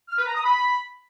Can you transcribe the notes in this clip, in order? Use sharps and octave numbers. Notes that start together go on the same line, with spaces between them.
F6
B4
A#5
D#6
B5